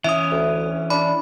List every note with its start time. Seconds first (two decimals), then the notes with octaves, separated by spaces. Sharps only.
0.04 E3 C#4 E5 D#6
0.31 D2
0.90 D4 B5